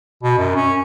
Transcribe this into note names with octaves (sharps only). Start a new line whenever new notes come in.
B2
F#2
C#4